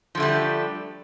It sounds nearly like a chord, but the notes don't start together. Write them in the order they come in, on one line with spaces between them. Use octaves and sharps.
F3 D3 A3 G3